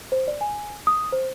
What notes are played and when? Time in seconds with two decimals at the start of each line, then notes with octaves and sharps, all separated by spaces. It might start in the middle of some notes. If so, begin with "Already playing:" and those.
0.12 C5
0.28 D5
0.41 G#5
0.87 D#6
1.12 C5